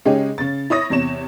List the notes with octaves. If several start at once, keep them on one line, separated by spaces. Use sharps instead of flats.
C#3 G#3 C#4 D#4 G4 G#4
C#3 A6
E4 C#5 D#6 A#6
E2 C3 C#5 E7